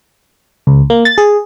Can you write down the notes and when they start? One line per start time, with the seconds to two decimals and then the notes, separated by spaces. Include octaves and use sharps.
0.67 C#2
0.90 A#3
1.05 A6
1.18 G#4